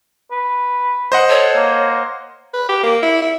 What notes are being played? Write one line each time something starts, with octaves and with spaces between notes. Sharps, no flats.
B4
C5 D#5 F#5
A4 C#5
A#3
B4
G4
A#3
E4
E4